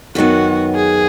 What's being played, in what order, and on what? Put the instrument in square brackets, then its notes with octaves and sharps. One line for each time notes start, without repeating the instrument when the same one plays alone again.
[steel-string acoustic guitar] F#2 D#3 F#3 B3 [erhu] F#4
[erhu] G#4